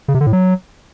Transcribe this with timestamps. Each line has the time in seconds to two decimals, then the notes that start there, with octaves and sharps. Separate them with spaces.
0.08 C#3
0.14 C3
0.21 D3
0.27 A2
0.33 F#3